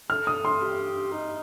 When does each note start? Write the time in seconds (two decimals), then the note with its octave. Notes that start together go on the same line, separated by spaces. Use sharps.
0.10 A4 F6
0.27 D#6
0.45 C6
0.61 G4
1.11 D#4